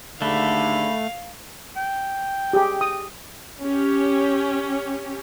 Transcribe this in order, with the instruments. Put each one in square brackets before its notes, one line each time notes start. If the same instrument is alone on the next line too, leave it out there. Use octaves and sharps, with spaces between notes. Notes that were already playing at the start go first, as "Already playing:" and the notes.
[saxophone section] D#2 G#2 D3 [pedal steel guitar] A3 [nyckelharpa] F5 [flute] B5
[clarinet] G5
[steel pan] G4 G#4
D#6
[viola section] C#4 G4